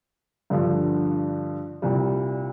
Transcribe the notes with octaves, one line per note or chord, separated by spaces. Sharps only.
G2 D3 F3
C2 A#2 G3